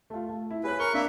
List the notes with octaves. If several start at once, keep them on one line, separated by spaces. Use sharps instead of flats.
A3 F4
A3
E4
G#4 B4 C#5 F#6
A#4 C#6 F#6 G7
A#3 D4 E5